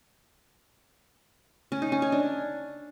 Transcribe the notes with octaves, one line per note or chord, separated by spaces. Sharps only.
C#4
D#4
C#4
C#5
D4